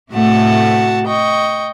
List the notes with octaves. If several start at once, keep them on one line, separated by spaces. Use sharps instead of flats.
A2 C3 A3 F#4 F#5 A5
D#5 G5 C#6